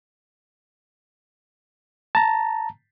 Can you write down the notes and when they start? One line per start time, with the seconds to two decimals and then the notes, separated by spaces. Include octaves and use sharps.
2.15 A5 A#5